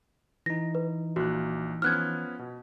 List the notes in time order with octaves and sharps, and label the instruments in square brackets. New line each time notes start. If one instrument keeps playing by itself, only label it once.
[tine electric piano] E3 D#4 [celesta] A#6
[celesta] B4
[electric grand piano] A#1 A#3 F#6 [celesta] F#4
[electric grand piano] F3 B3 C#4 [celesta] F6 F#6 G#6
[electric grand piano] B2